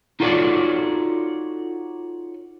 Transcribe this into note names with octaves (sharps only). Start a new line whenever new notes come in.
D#4 F4 F#4 A4 C#5 D5